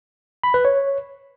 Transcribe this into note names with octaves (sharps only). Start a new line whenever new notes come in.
B5
B4
C#5